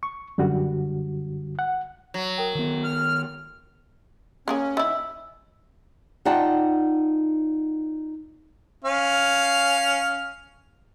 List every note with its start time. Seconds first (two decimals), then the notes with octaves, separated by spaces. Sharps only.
0.03 C#6
0.38 F#2 D3 G3 F#4
1.59 F#5
2.14 F#3
2.38 A#4 G5
2.55 D#3 B3
2.84 F6
4.48 C#3 A#3 C#4 G#4
4.77 D#3 E4 E5
6.25 D#4 F4 D5 F#5 G5 A5
8.85 C#4 F5